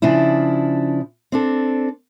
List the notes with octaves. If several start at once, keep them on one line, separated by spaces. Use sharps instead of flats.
C#3 F3 D4 E4
C4 D4 A4